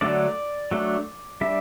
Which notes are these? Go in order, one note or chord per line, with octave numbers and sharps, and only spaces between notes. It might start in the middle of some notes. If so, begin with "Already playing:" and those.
D3 F#3 A3 D4 D5
F#3 A3 D4
G3 D4 E5